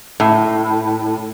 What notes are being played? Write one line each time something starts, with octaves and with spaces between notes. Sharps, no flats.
A2